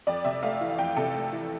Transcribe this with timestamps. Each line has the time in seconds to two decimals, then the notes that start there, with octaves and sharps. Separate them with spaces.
0.07 F2 D5
0.24 C3 E5
0.42 A3 F5
0.61 E3
0.70 F5
0.78 F2 G5
0.96 C3 A4
1.15 A3
1.32 E3